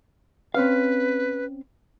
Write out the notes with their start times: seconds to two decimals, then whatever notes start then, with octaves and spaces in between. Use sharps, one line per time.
0.54 C4 C#4 B4 F5